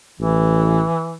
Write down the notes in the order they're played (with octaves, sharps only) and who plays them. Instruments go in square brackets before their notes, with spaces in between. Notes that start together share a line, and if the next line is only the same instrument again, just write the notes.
[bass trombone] A1 [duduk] E3